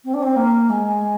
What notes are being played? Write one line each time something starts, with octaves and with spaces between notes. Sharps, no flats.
C4
D4
C4
A#3
G#3